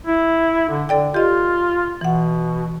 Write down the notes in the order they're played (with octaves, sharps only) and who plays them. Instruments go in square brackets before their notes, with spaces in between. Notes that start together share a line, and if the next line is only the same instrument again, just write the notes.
[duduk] E4
D3
[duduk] D3 [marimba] A4 D5 G5
[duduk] F4 [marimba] G4 D#5
[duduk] B2 [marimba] E3 F#5